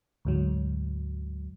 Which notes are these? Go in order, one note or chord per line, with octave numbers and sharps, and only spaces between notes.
D2 G#2 F#3